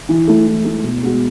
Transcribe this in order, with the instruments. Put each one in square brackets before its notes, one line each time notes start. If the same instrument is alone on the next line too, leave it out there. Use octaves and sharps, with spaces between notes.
[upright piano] E3
A3 E4
E3
A3 E4
B2
G#3 B3 F#4